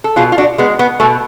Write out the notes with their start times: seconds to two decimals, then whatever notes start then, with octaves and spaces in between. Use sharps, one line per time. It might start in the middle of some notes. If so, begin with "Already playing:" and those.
0.04 A4
0.16 B2 F4 G#4
0.32 F4
0.38 D4 F#4
0.58 G#3 B3
0.79 B3
1.00 B2 A3